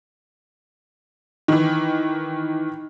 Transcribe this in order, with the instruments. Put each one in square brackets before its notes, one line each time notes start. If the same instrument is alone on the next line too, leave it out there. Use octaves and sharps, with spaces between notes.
[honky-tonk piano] D#3 E3